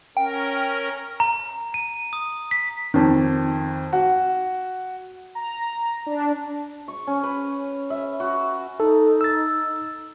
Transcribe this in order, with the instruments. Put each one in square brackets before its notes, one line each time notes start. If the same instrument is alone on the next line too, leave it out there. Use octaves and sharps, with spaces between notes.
[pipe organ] C#4 A#4 [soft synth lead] G5
[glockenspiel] A#5
D#7
D#6
B6
[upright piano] F2 D#3
F#4
[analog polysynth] A#5
D4
[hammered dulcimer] C#6
C#4
B4
E5
F#4
[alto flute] D#4 [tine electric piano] A4
[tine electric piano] E6 A6